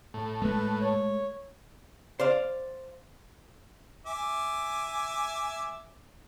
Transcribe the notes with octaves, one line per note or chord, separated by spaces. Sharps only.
A2
G#3 A3 B4
C#5
C5 D5 F5
E5 G#5 D6